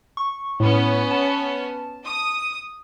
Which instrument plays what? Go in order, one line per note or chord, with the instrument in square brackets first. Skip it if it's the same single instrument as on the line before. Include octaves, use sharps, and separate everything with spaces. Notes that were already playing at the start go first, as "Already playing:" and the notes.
[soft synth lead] C#6
[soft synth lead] A2 [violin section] B3 C#4
[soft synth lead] A5
[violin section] D#6